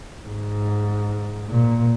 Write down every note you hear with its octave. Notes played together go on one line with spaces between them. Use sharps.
G#2
A#2